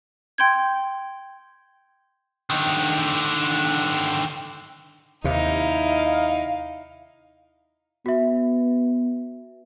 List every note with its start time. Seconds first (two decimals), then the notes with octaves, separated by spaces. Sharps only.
0.38 G5 C6 G6 G#6
2.50 D3 D#3
5.24 D#2 C3 D#4 E4 F5
8.06 B3 F#4 E5